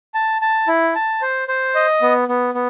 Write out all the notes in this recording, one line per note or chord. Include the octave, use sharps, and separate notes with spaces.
A5
A5
E4
A5
C5
C5
D#5
B3
B3
B3